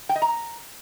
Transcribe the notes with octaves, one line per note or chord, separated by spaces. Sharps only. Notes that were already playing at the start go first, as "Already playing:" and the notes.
G5
D#5
A#5